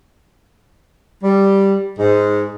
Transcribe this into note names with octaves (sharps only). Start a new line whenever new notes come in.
G3
G#2